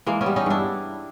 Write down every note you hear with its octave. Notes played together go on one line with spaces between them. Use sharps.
E3 G#3 A#3
B3 C#4
G3
C#4 D#4
G2 D4 E4